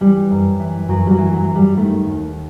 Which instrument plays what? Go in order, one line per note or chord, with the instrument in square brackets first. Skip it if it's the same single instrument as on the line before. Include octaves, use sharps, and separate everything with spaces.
[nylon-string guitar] E3 G3
F#2
E3
F#2 F#3
G3
F#3
E3
F#3
F#2
G3
D#3 A3
D#2